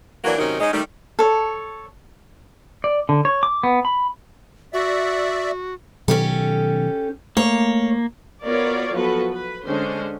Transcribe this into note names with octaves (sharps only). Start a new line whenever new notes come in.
E3 F#3 A#3 D4 F#4 A#4
C3 D#3 F#3 C#4 D#4 A#4
G#3 C#4 D#4
D#3 G3 A3
A4 C#5
D5
D3
C#5
D6
B3
B5
F#4 D5 E5
B2 D#3 F#3 C#4 G4 A4
A3 A#3 C#5
B3 F4 F#4 A#4 C#5 D5
F3 F#3 B3 F#4 A4 B4
B4
D3 G#3 C#4 D4 C5